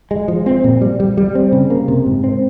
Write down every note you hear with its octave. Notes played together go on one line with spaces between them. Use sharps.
G#3
F3
C4
A#2
G3
G3
G3
C4
C#3
A#3
C3
G#2
C4